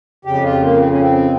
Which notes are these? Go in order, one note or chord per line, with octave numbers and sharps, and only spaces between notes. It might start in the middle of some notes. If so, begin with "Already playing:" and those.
F2 C#3 G4
F4
A#3
C4
C#4
C4